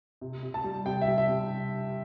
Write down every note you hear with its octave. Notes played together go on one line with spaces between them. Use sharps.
C3
C3
A5
G3
C3 G5
E5
G3
E5
C3